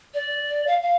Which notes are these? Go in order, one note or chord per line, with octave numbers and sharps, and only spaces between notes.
D5
F5
F5